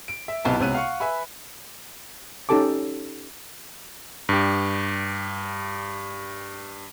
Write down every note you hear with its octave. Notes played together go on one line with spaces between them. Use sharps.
D7
E5
B1 C3 B3 E4 D#5 A5
C#2 C3 B3 C#5 F#6 D#7
F5 F#5 C#6 C#7
B4 E5 G#5 B5
C#4 D#4 G4 A4 A5 D6
G2 G4